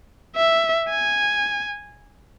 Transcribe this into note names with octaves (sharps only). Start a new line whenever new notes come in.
E5
G#5